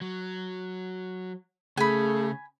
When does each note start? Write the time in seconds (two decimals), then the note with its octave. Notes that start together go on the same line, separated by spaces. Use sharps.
0.01 F#3
1.77 C#3 A3 G#4 G#5 B5